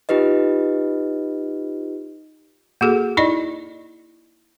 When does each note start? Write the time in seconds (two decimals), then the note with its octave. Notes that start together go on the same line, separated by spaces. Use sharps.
0.09 D#4 F4 G4 B4 D#5
2.81 A#3 F#4 G#4 A4
3.17 D#4 E4 D5 D#5